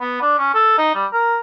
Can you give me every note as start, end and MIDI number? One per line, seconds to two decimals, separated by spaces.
0.01 0.19 59
0.21 0.37 62
0.38 0.51 61
0.54 0.77 69
0.78 0.93 63
0.95 1.06 55
1.13 1.40 70